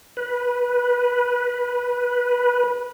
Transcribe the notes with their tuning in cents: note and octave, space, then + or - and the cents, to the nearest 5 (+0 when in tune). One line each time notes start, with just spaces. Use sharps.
B4 -15